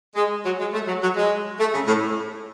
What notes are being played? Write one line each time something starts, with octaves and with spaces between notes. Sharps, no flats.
G#3
F#3
G#3
A3
F#3
F#3
G#3
A3
C#3
A2